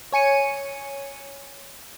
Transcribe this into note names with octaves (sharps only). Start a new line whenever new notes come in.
C#5 G#5 C#7 D#7